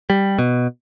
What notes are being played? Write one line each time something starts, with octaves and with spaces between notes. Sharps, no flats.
G3
B2